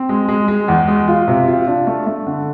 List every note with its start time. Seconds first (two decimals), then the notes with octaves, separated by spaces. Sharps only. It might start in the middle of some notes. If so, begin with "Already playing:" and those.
Already playing: C4
0.09 G#3
0.28 G#3
0.48 G#3
0.68 E2
0.88 G#3
1.08 F4
1.28 C3
1.47 F4
1.67 D4
1.87 A3
2.07 A3
2.27 D3